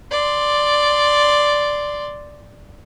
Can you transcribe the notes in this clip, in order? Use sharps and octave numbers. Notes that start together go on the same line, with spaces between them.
D5 C6